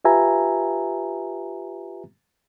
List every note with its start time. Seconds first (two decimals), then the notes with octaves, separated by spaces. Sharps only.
0.05 F4 G4 B4 E5 G#5 A#5